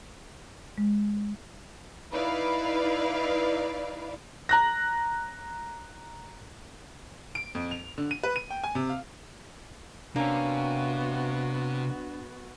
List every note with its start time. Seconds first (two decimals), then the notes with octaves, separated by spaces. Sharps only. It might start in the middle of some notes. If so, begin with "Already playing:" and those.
0.78 G#3
2.12 D#4 E4 B4 D5 F5
4.49 A#5 F#6 A#6
7.35 D7
7.55 F2
7.71 F7
7.98 D3
8.11 D#7
8.24 B4
8.36 D#7
8.50 G5
8.64 G#5
8.75 C3
8.89 F5
10.16 C3 A#3 B3 C#4 D4 F#4